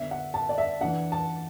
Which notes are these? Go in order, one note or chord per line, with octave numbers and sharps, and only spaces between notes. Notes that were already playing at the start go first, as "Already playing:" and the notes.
Already playing: D3 B3 D4 E5
F#5
A5
D5
E5
E3 D4 F#5
A5